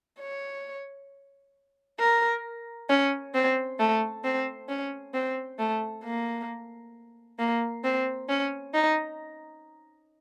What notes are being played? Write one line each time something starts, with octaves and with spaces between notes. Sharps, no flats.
C#5
A#4
C#4
C4
A3
C4
C#4
C4
A3
A#3
A#3
C4
C#4
D#4